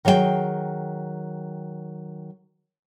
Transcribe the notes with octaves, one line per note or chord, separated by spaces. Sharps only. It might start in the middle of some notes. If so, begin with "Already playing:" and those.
D#3 F#3 G#4 D5 G5